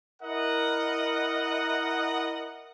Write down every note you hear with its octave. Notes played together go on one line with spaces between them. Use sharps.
E4 A#4 D#5 F#5